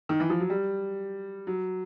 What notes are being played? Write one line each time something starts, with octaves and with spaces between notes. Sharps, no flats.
D#3
E3
F3
F#3
G3
F#3